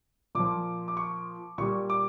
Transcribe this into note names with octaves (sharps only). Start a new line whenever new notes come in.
A#2 F3 D6
D6
C#6
A#2 G3 C#6
D6